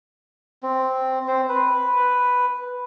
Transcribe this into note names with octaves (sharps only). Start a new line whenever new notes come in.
C4
C4 C5
B4